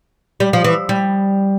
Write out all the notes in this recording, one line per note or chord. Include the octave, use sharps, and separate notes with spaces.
G3
F3
E3
G3